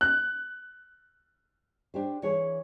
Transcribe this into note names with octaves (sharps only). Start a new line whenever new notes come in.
F#6
D4 G4 C5
E3 G#4 C#5